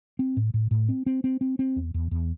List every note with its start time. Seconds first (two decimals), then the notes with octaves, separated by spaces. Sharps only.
0.19 C4
0.37 A2
0.54 A2
0.71 A2
0.89 C4
1.06 C4
1.24 C4
1.41 C4
1.59 C4
1.76 E2
1.94 E2
2.11 E2